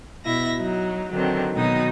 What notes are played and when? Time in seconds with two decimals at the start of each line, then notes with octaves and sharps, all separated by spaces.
0.25 B2 E4 E5 A#6
0.59 F#3 D#4
1.11 D3 D#3 F#3 C4 D4
1.54 B2 D#3 F#3 D#4 D#6